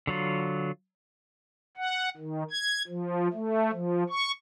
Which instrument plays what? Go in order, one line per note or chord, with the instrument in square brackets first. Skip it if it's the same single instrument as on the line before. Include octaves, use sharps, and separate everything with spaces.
[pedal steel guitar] D3 F#3 F4
[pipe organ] F#5
D#3
G#6
F3
A3
F3
C#6